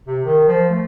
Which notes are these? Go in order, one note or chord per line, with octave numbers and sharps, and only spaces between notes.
C3
D#3
F3
A3